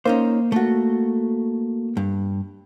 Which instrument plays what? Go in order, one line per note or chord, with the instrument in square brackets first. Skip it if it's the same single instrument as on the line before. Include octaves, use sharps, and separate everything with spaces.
[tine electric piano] A#3 [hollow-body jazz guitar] C#4 D#4 C5
[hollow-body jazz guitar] A3 F#4
G2